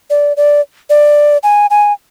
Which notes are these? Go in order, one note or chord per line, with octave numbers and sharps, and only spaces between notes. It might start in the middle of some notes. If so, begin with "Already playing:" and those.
D5
D5
D5
G#5
G#5